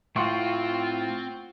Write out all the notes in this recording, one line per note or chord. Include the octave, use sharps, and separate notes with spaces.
A2 C4 F4 F#5 C6 C#6